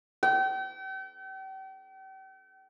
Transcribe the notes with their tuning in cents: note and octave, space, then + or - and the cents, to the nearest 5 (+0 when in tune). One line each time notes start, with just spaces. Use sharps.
G5 -40